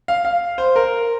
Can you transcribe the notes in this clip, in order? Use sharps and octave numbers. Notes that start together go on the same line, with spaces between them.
F5
F5
C5
A#4